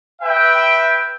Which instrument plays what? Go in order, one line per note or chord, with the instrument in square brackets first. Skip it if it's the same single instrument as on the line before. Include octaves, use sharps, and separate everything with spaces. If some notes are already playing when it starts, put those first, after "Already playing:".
[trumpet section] B4 E5 G5